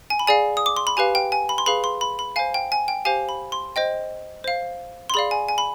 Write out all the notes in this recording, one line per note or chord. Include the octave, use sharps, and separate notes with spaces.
G#5
B5
G#4 D5 F5 G#5
D#6
D6
C6
B5
G4 B4 F5 G#5
G5
G#5
B5
C6
G#4 B4 F5 B5
C6
B5
B5
C5 F5 G#5
G5
G#5
G5
G4 C5 F5 G#5
B5
C6
C5 D#5 G5
C5 F5
C6
G#4 D5 F5 B5
G#5
G#5
B5